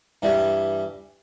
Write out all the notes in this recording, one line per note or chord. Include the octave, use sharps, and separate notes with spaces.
G2 E3 G3